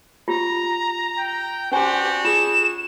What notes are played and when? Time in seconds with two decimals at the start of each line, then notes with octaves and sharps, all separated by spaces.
0.28 F4 G4 A#5
1.19 G5
1.72 C#4 D4 F#4 G4 C5 G#5 A#5
2.25 F4 G#4 E7